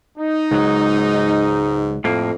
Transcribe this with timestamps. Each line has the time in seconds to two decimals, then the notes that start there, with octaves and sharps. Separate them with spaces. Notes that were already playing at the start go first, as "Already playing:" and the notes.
0.18 D#4
0.51 C#2 G#2 F#3
2.04 F2 A2 A#3